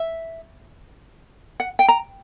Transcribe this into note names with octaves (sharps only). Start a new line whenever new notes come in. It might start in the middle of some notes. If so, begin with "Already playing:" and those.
Already playing: E5
F#5
G5
A#5